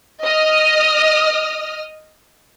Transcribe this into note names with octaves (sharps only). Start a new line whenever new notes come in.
D#5 D#6 F6